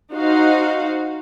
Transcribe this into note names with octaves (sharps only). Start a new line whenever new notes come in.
D#4 F#4 C5 F5